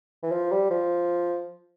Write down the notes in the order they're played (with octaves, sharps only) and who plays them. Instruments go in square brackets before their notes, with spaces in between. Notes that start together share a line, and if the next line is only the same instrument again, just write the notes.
[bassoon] E3
F3
G3
F3